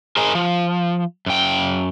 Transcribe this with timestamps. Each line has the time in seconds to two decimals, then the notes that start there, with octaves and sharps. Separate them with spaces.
0.17 G#4 A#4 C5 D#5 G#5
0.35 F3
1.26 F#2 G5